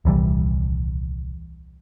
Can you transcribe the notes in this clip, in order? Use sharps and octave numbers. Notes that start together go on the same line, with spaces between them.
D#1 C2 E3 G3